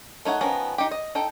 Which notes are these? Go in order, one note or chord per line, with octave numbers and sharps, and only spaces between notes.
A3 D#4 C#5 F#5
D#3 F3 B3 C#4 A#5
D#4 G4
D#5
D#4 A4 G5